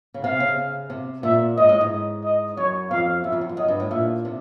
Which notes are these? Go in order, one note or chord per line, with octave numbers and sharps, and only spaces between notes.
C#3
C3 F5
C#3
C3
A#2 E5
G#2 D#5
A2
G#2
D#5
F#2 C#5
F2 F5
F#2 E5
F2
F#2
F2
F#2 D#5
G2
A2
A#2 E5
C3